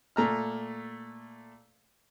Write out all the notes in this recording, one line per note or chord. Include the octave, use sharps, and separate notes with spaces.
A#2 A3 A#5 F6